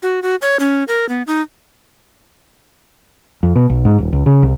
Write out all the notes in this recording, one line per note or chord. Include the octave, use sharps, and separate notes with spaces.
F#4
F#4
C#5
C#4
A#4
B3
D#4
F2
B2
B1
G#2
D#1
C#2
C#3
C2